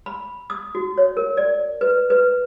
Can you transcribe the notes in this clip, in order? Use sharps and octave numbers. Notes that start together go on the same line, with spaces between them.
B5
D#6
F#4
C#5
A#4
D5
B4
B4